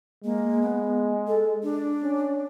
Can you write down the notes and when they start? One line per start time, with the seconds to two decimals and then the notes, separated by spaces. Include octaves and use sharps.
0.24 G#3 A#3
0.62 B3
1.27 A4
1.63 D4
2.03 C#4